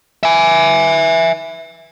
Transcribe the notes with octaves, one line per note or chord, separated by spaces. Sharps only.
E5 G#5